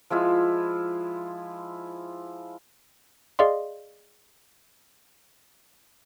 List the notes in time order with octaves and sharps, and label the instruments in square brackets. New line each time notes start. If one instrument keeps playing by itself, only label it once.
[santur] F3 G#3 E4 F4
[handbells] G#4 D5 D#5 F5 C6